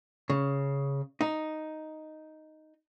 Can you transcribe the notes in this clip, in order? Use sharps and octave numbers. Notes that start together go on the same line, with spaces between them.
C#3
D#4